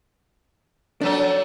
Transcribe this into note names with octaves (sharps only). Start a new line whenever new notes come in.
F3 F#3 D4 A4